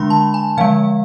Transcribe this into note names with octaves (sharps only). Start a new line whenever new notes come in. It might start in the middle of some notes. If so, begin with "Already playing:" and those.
Already playing: D3 G#3 D4 B5 C6
A5
G#5
D3 F3 G#3 F5